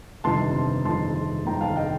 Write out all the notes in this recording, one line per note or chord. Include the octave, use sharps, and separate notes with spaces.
G1 F2 C3 D#3 A5 C6
G1 F2 C3 D#3 A5 C6
G1 F2 C3 D#3 G5 A#5
F5 A5
D#5 G5